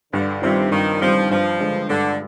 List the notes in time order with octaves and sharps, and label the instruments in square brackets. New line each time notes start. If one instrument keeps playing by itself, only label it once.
[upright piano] G2 [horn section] D3
[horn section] C3 [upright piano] D#3 G3 C4 F4
[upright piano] G2 [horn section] D#3
[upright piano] D#3 G3 C4 F4 [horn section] F3
[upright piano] G2 [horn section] F3
[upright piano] D3 G#3
[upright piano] G2 [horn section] D3